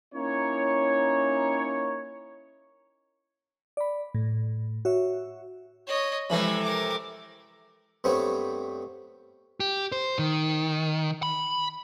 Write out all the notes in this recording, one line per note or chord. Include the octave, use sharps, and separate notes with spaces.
A#3 C#4 D#4 E4 C#5
D5 B5
A2
F#4 C#5 E5
C#5 D#5
C3 E3 F3 G#3 A3 B5
A#4 D6
G2 A3 B3 C4 C#5
G4
C5
D#3
B5